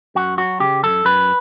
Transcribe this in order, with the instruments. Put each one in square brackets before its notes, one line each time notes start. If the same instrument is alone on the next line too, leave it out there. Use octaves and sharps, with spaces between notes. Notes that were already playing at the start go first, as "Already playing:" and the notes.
[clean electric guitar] F#2 F#4
F#3 F#4
C#3 G4
F#2 A4
F#2 B4